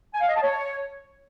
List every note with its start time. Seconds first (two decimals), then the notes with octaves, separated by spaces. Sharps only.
0.14 G#5
0.21 F5
0.28 D#5
0.35 A5
0.42 C#5